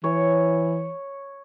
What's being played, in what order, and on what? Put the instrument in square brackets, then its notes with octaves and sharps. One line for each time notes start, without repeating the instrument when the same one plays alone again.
[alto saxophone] E3 [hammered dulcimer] C#5